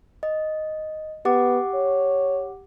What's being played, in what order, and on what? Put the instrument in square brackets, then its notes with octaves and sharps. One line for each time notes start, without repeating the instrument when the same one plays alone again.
[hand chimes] D#5
[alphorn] B3 [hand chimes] G4 F#5 D6
[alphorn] C#5